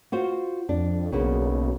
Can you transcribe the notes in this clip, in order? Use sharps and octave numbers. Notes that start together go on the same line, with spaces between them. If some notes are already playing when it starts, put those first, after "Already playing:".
F4 F#4 C5
F2 D4
B1 C#3 A#3 B3